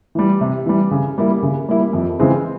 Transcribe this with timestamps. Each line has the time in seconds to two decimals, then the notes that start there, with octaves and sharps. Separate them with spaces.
0.15 E3 G3
0.41 C3
0.66 E3 G3
0.91 C#3
1.18 G3 A#3 E4
1.43 C#3
1.68 G3 A#3 E4
1.93 F2
2.19 C#3 E3 G#3 C4